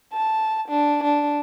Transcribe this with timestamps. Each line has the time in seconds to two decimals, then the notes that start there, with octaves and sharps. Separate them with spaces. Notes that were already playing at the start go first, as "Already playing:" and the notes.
0.13 A5
0.68 D4
1.04 D4